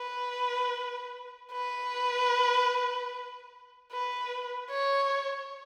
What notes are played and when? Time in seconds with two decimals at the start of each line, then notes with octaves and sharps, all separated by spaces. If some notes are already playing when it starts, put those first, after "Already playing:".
Already playing: B4
1.52 B4
3.92 B4
4.70 C#5